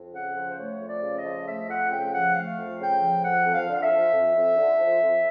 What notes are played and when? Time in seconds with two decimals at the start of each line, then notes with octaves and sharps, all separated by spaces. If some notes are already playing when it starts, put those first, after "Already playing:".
Already playing: F2
0.14 C#3 F#5
0.36 F3
0.50 C5
0.58 A3 C#5
0.80 F2
0.89 D5
1.03 C#3
1.18 D#5
1.24 F3
1.47 A3 E5
1.69 F2 F#5
1.91 C#3 G5
2.14 F3 F#5
2.35 A3 F5
2.58 F2
2.79 C#3 G5
3.02 F3
3.24 F2 F#5
3.46 F2
3.54 F5
3.69 D3 F5
3.83 E5
3.91 F3
4.13 F2
4.36 F2
4.57 D3
4.80 F3
5.02 F2